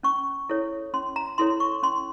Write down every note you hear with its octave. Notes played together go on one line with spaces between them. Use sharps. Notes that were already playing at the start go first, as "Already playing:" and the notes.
C#4 C#6
E4 A4 C#5
C#4 C6
A#5
E4 A4 C#5 C6
C#6
C#4 C6